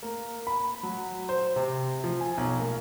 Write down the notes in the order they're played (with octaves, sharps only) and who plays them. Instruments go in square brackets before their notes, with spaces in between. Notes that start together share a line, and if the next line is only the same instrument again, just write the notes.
[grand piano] A#3
B5
F#3
C5
C3
F3
G#5
B1
A#3